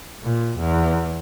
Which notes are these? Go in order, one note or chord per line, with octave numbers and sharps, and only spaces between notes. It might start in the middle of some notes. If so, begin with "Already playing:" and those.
A#2
E2